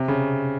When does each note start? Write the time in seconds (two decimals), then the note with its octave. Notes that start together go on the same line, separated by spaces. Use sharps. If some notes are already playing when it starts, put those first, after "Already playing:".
Already playing: C3
0.08 C#3